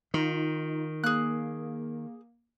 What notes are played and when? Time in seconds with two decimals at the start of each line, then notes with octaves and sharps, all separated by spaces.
0.14 D#3 D#4 F4
1.04 A#3 G#4 F#6